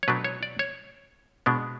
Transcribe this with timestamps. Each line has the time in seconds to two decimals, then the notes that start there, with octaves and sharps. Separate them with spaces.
0.03 C#5
0.08 B2 F#3 A3 D4 B4
0.24 C#5
0.43 D5
0.59 C#5
1.46 B2 G#3 B3 D4